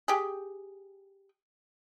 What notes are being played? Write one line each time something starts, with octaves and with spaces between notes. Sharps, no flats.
G4 G#4